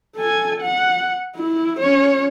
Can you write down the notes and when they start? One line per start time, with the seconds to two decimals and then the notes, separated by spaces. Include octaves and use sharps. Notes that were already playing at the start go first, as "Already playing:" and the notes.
0.16 A4 G#5
0.61 F#5
1.37 E4
1.80 C#4 C#5